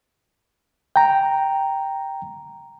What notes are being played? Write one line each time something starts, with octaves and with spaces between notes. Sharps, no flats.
G5 A#5